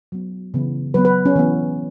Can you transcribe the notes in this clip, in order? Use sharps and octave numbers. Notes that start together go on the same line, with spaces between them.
F#3 B3
C#3 E3 B3
F#3 B3 B4
B4
C#4
E3 B3